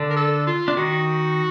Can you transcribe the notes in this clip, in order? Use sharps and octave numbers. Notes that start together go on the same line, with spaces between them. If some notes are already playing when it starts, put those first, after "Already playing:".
Already playing: D3 D4
A#4
A4
F4
D4
D#3 D#4 F#4